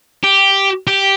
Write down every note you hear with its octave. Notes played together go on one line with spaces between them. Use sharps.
G4
G4